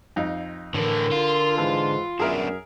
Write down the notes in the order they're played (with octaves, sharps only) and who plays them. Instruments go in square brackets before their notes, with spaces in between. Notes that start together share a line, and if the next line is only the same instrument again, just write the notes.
[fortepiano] F2 D#4 F5
[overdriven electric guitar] A2 E3 [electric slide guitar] D3 [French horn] A#4
[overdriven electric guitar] F4
[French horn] G#2 [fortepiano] E3
[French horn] F#2 [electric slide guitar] B3 D4 F#4 [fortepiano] G#4 A#4 E5